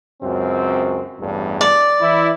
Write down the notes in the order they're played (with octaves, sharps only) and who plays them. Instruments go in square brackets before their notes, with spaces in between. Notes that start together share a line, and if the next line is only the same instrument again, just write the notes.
[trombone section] C#2 F#2 C4
A1 E2 G2
[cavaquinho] D5
[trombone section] E3 E4